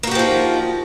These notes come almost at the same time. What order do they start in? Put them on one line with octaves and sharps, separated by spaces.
A#3 F#4 G4 F3 D#3